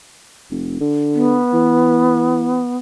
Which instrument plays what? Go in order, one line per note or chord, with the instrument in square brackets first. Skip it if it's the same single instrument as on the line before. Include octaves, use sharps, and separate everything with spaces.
[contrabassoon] F1
D3
[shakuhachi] B3
[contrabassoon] E3